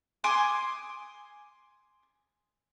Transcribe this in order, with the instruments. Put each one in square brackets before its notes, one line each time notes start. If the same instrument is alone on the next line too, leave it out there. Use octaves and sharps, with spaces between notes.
[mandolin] G#5 C6 D6 D#6